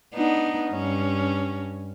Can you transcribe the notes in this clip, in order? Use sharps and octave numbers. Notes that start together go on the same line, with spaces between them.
B3 D4 D#4
G2 C#4